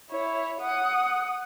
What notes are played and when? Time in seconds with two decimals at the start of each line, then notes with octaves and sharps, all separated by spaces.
0.11 E4 C#5
0.61 F#5 D#6